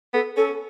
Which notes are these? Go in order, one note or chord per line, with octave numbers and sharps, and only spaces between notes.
B3 A4
C#4 A4